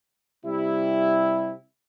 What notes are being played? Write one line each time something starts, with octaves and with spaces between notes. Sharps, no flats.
C3 G3 E4